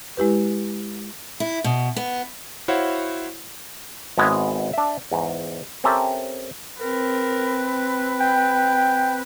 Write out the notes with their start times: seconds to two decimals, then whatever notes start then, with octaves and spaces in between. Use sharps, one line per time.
0.17 G#3 E4 G4 B4
1.40 E4
1.64 B2
1.96 B3
2.68 E4 F#4 C5 C#5 F5 F#5
4.18 G#1 G#3 B3 E4 C#5
4.73 D4 E5
5.12 E2 G#2
5.84 C4 C#4 G4 A4 A#4 E5
6.80 C4 A#4 B4
8.21 G5